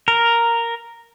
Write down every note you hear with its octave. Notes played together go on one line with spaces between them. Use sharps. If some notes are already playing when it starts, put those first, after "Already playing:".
A#4